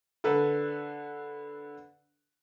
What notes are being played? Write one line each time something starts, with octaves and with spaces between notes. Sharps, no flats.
D3 A4 B4